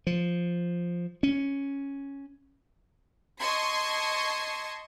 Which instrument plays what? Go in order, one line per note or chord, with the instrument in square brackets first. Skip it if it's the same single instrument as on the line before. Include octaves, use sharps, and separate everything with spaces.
[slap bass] F3
C#4
[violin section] D#5 A5 C6 C#6 G#6 C7